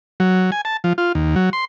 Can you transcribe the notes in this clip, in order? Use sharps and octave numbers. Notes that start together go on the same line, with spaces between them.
F#3
G#5
A5
F3
F4
D#2
F#3
C6